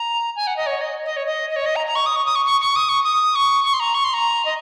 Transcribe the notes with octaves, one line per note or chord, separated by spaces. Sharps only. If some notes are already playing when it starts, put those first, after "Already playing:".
Already playing: A#5
G#5
F#5
D#5
C#5
D#5
D#5
C#5
D#5
D#5
C#5
D#5
A#5
A#5
C#6
D#6
C#6
D#6
C#6
C#6
C#6
D#6
C#6
D#6
C#6
C#6
C6
A#5
C#6
C6
A#5
D#5